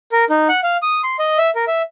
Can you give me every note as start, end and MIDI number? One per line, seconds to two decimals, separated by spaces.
0.12 0.25 70
0.30 0.48 63
0.49 0.60 78
0.63 0.77 77
0.82 1.01 87
1.04 1.17 84
1.19 1.38 75
1.38 1.50 76
1.55 1.65 70
1.68 1.82 76